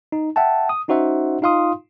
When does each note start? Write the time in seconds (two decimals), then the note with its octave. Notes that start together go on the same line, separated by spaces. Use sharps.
0.12 D#4
0.36 E5 F#5 G5 A5
0.69 D#6
0.88 C#4 D#4 F#4 C5 E5 F#5
1.42 D#4 F4 F5 C6 D#6